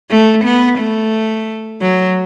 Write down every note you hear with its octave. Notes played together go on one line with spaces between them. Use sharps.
A3
B3
A3
F#3